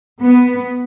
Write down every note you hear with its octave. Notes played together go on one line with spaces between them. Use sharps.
B3